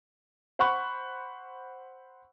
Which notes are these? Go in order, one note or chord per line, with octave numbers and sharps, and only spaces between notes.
C5 F#5 B5 C#6 F#6